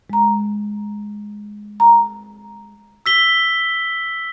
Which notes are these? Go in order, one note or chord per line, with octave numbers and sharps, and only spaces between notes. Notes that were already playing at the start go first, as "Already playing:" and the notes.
G#3 A#5
A#5
E6 B6 G7